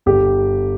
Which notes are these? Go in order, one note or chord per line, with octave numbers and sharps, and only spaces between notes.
G1 G4